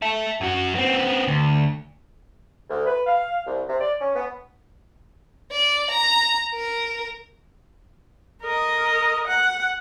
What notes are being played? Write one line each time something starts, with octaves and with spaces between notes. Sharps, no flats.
E5 A5
F#2 F#4
B3 C4
D2
D2
B4
F5
C2
C3
D5
C#4
B3
D5
A#5
A#4
A#4 D#5
F#5